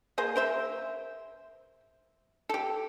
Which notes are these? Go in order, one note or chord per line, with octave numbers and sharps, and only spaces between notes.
A#3 G#4 C5
A#4 C5 E5
G4 A4